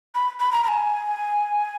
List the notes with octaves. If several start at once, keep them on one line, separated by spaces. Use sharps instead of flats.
B5
B5
A#5
A#5
G#5